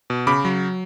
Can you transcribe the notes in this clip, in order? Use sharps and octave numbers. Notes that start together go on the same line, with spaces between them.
B2
C#3 B5 D6
F#3